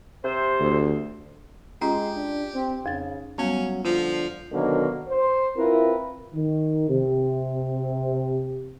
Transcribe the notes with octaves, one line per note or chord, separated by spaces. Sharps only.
C3 C5
D2
G#3 C#4 F4 G4 A#5
D4
C4
F2 C#3 A6
F#3 G3 B3 C#4
D3 F3 F4
B2 D3 D#3 F#3 A#3
C5
C4 E4 F4 A#4 B4
D#3
C3